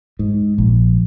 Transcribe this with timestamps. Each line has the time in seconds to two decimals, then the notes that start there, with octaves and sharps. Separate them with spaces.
0.19 G#2
0.58 A#1